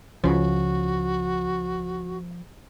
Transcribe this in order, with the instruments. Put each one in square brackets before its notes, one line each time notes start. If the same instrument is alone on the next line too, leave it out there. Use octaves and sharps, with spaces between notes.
[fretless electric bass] C#2 C#3 [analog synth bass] F3 [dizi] F#4